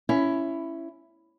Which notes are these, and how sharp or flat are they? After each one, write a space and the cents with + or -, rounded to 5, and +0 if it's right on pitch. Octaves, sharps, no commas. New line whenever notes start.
C#4 +5 E4 +10